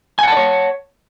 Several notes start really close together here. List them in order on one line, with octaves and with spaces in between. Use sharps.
G#5 F#5 A5 D5 C#5